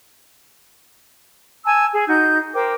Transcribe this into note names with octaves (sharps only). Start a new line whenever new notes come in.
G#5 A5 E6
G#4
D#4 F#4 G6
A#4 C5 G5 D6